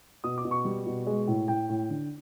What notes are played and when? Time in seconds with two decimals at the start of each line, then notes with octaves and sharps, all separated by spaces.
0.24 B2 D#6
0.38 D6
0.45 B2
0.51 C#6
0.65 G3
0.86 B2
1.07 G#3
1.27 A2
1.48 A2 G5
1.69 A2
1.89 D3